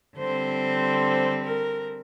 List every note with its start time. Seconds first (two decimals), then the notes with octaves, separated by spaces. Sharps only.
0.17 D3 G3 C4 C5
1.45 A#4